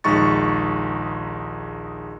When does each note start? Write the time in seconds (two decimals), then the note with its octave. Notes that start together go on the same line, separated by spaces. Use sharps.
0.04 A#1 D#2 G#3 D#4 C#6 A6